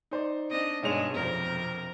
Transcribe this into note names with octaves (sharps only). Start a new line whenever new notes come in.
D#4 C5 D5
C4 D4 D#5
B1 G2 G#3 C#5 F7
F2 C3 A#4